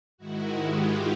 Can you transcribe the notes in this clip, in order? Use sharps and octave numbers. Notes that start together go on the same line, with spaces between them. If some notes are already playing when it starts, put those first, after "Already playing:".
G#2 D#3 G#3 E4 F#4
F4 G4